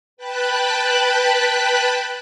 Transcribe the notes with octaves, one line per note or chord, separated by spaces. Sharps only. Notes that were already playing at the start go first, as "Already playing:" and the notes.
B4 G5 A5 B5 F#6